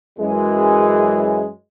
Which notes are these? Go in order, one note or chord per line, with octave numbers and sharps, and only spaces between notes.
F#2 E3 G#3